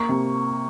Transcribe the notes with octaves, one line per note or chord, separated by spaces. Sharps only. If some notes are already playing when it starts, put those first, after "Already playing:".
Already playing: A#3 C#6
C3